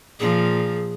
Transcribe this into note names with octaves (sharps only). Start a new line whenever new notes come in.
A#2 F3 G#4